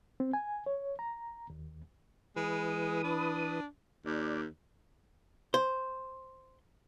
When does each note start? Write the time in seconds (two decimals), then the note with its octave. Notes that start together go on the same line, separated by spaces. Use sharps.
0.20 C4
0.33 G#5
0.66 C#5
0.99 A#5
1.50 D#2
2.36 E3 G#3 B4 D#6
3.04 D4
4.06 D#2 D5
5.54 C5